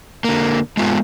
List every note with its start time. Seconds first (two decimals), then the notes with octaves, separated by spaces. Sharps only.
0.25 D3 A#3
0.77 G#3 A3 B3 F4